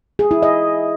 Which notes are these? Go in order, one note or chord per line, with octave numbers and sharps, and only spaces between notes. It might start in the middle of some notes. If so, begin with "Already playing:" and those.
G#4
E4
D#5